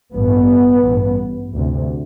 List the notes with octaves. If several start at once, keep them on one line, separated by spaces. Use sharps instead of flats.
A1 G2 B3
A1 G2
D2 C3